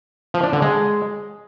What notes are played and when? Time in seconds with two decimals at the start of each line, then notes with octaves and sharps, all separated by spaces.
0.34 F3
0.43 D4
0.53 D3
0.62 G#3